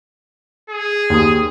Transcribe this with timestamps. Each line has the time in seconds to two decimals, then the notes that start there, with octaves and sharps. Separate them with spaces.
0.70 G#4
1.10 D#2 D#6